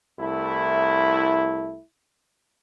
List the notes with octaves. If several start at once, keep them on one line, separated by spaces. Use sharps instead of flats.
C2 A3 E4